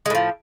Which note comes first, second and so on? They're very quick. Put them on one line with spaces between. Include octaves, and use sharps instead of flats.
G#3 A2 F3